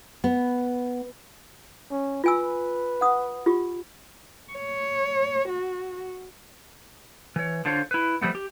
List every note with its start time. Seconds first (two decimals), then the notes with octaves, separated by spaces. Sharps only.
0.24 B3
1.91 C#4
2.24 F4 B4 G#5 E6
3.01 F#5 D#6
3.46 F4 G4
4.53 C#5
5.49 F#4
7.36 E3 C#5
7.65 D3 D4 F4 C5 C#5
7.91 E4 B4
8.21 F3 G3 A3 B3
8.35 G4